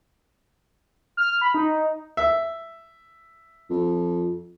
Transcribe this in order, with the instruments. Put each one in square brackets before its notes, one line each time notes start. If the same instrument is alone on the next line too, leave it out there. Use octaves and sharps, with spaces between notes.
[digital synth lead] F6
B5
D#4
[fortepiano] E5
[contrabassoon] F2